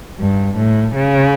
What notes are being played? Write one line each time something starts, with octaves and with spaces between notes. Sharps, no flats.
G2
A2
C#3